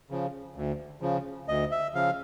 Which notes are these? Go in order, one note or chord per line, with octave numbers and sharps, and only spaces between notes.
C#3 F3
D2
C#3 F3
D2 D#5
E5
C#3 F3 F5